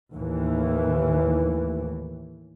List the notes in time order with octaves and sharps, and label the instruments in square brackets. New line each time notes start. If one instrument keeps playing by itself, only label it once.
[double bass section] D#2 A2 E3